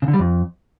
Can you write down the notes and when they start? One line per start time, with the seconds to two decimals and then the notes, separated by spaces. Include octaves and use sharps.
0.02 C#3
0.08 D3
0.14 G3
0.19 F2